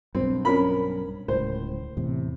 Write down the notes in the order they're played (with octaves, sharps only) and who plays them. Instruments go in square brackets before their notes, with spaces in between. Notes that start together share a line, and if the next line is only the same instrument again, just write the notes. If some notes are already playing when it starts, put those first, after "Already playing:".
[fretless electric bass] B1 G2 [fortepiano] C4
[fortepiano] C#4 A#4 B5
[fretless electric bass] D1 C#2 A2 [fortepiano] C5
[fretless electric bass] E2 A2 C3